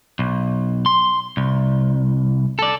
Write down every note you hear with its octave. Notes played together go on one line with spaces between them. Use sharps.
B1
C6
C2
A4 D5